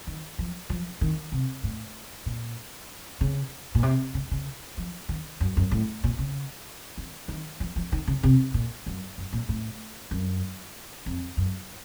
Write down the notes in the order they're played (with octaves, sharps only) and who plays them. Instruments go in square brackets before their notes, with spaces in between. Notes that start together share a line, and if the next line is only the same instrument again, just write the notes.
[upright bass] D#3
F3
F3
D#3
C3
A2
A#2
C#3
A#2
C3
C#3
C#3
F3
D#3
F#2
F#2
A2
A#2
C#3
D#3
D#3
F3
F3
D#3
C#3
C3
A#2
F#2
F#2
A#2
A2
F#2
F2
F#2